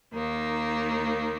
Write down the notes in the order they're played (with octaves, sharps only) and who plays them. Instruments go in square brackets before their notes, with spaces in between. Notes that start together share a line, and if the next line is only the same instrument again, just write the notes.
[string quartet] D#2 D#3 A#3